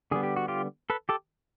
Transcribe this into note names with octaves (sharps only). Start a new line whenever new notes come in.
D3 G3 B3 G#4
G4
F#4
F4 G4
A4 B4
G4 A4